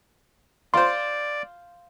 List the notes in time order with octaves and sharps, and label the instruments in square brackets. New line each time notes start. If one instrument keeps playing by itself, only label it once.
[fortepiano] F4 C5 [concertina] D5 [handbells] C6